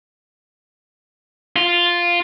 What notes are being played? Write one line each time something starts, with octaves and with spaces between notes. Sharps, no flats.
F4